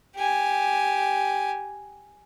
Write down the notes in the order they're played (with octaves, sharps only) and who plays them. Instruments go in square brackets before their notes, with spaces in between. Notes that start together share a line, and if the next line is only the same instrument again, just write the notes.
[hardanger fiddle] G4 G#5